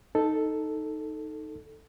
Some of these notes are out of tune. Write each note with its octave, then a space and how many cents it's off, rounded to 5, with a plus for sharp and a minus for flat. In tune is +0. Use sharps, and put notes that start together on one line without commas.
D#4 +0 A4 +0